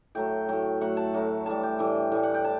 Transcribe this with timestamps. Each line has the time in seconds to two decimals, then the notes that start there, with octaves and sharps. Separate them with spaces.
0.15 A2 F#3 A3 G5
0.48 A2 F#3 A3 G5
0.81 A2 F#3 A3 F#5
0.97 A5
1.14 A2 F#3 A3
1.46 A2 E3 G3 A5
1.63 G5
1.79 A2 E3 G3 G5
2.12 A2 E3 G3 G5
2.23 F#5
2.34 G5
2.44 A5